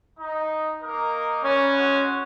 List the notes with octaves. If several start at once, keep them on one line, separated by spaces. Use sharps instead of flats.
D#4
A#3 D#4 A#4
C#4 B4 C#5 D5
G#3 F#4 F#5